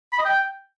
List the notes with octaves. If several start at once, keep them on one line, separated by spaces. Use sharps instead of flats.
B5
D#5
G5